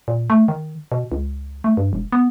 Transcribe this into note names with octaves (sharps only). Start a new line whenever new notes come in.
A#2
A3
D#3
B2
C#2
A3
G2
E1
B3